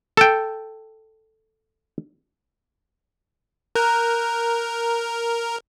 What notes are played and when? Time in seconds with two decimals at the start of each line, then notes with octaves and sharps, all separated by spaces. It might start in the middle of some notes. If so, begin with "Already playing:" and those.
0.17 A4 G5
3.75 A#4 A#5 F#6 G6